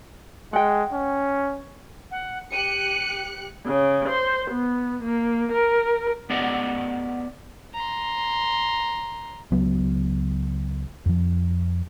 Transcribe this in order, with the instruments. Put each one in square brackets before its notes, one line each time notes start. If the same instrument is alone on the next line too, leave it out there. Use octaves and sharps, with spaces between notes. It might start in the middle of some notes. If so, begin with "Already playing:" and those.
[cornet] G#3 [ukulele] F#5 G5
[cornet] C#4
[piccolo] F#5
[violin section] G4 F#6 C#7 [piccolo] D#7
[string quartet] C#3
C5
B3
A#3
A#4
[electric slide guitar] B3 G4 D5 D#5 F#5
[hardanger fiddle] A#5 C6
[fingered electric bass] C#2 F#3 B3
F2 F3